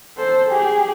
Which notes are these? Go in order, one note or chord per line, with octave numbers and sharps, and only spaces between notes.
A4 C5
G4 G#4